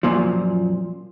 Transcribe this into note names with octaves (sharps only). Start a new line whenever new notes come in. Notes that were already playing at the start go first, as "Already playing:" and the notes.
F#2 A#2 F3